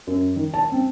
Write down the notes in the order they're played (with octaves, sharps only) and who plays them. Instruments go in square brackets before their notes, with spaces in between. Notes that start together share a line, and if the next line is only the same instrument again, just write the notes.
[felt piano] F#2
D#3
A5
C4